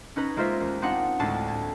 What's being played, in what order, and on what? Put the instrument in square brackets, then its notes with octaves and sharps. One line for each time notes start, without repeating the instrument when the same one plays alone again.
[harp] C#4 D#4 B4 A#5
G#3 A#3 F4 C5 E5
D#2
C4 D4 D#4 F4 F5 F#5
D2 A2 G#3 D4 A5 C7
A5 G#6